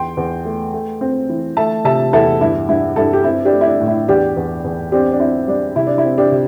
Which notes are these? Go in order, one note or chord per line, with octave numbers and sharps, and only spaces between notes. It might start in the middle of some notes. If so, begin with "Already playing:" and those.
Already playing: E2 G5 C6
E2
A3
A3
C4
E3
A3 E5 A5
C3 E5 A5
E2 E4 A4
G2 E4
G2 E4
G2 E4 A4
G4
C4 E4
D4 G4
A3
E4
D4
A2
E4
E2 D4 G4
E2
E2
C4 D4 G4
D4
C4 E4
G3 D4
C3 E4
D4
E4
C4
D4 G4
C3